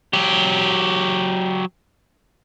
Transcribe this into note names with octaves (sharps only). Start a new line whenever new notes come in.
F#3 G4